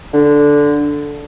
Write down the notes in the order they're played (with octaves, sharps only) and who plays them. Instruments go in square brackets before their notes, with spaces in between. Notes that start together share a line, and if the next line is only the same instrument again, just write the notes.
[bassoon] D3